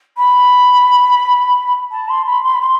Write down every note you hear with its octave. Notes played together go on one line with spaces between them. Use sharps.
B5
A5
C6
B5
C6
B5
C6